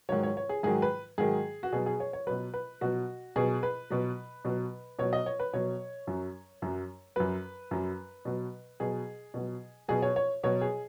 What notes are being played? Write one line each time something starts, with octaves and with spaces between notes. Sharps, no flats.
G#2 D#3 F#3 C#5
C#5
C#5
G#4
G#2 D#3 F#3 G#4
B4
G#2 D#3 F#3 G#4
F#4
B2 F#3 G#4
G#4
C#5
C#5
B2 F#3 B4
B4
B2 F#3 F#4
B2 F#3 G#4
B4
B2 F#3
B2 F#3
B2 F#3 C#5
D#5
C#5
B4
B2 F#3 C#5
F#2 F#3
F#2 F#3
F#2 F#3 B4
F#2 F#3
B2 F#3
B2 F#3 G#4
B2 F#3
B2 F#3 G#4
C#5
C#5
B2 F#3 C#5
G#4